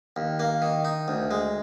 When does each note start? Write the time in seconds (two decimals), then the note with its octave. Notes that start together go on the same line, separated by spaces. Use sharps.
0.16 D#2
0.40 A#3
0.62 D#3
0.85 D#4
1.08 D2
1.31 G#3